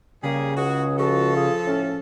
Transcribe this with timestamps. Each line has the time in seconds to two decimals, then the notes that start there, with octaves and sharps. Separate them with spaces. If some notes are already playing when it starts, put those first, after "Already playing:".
0.23 C#3 G3 A#3 G#4
0.56 C#2 F#4 G#4
0.99 F3 F#4 A4
1.36 F4 G#4
1.66 A2 C#4